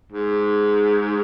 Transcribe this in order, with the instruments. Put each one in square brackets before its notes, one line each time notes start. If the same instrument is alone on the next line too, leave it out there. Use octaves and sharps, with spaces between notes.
[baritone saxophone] G#2